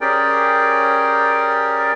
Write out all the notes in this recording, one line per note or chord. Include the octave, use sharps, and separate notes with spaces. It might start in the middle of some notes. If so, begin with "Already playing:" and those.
C#4 G4 G#4 A#4 D5 G5